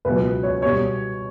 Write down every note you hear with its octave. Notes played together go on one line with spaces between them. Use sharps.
C#2 B2 F#3 B4
C#5
B2 G3 C#5